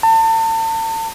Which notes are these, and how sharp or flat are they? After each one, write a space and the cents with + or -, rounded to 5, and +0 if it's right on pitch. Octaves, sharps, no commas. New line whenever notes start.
A5 +35